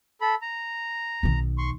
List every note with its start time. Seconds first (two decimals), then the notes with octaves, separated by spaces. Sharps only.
0.21 A4 B5
0.42 A#5
1.23 B1 D#3
1.58 C6 C#6